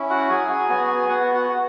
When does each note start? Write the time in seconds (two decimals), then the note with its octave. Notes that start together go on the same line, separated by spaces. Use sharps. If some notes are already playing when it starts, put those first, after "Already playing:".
Already playing: C#4 E4
0.10 F#4 F#5
0.29 F#3 G#4 G#5
0.69 B3 F#4
1.09 B3 F#4 F#5
1.35 F#4 F#5
1.49 F#4